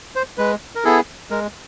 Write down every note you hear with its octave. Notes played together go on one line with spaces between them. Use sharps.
C5
G#3 B4
A#4
B3 E4 G#4 A4
G#3 A#4